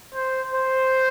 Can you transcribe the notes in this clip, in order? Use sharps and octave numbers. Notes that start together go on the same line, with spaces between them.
C5
C5